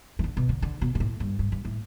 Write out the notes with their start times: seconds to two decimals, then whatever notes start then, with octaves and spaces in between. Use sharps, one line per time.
0.19 E3
0.24 D3
0.37 B2
0.49 D3
0.62 D3
0.81 B2
0.95 B2
1.00 A2
1.20 G2
1.39 G2
1.52 G2
1.65 A2